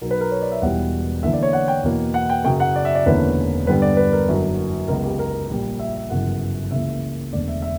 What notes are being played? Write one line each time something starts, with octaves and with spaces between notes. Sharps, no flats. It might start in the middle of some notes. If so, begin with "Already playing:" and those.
B1 B2 F#3 B3 A#4
B4
A#4
C#5
D5
E5
E1 E2 B2 G3 B3 F#5
E2 D3 A#3 E5
D5
C#5
F#5
G5
E2 B2 A#3
F#5
G5
F#2 C#3 F#3 G5
F#5
D5
E5
D5
E1 E2 D3 A#3 C#4 B4
G2 D3 G3 B3 B4
D5
B4
A#4
F#1 F#2 D3 F#3
C#2 C#3 F#3 B3 A#4
G4
A#4
A#1 A#2 G3 A#3
E5
E5
G1 F#2 C#3 E3 F#5
C#2 C#3 E3 A#3 E5
E1 D2 D3 D5
E5
E5